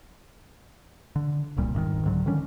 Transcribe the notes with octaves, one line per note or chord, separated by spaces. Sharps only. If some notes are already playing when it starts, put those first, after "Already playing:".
D3
D1 C2 A#2 G3
F1 G#2 C3 D#3
C2 G#2 D3 F#3
D3 D#3 G3 C#4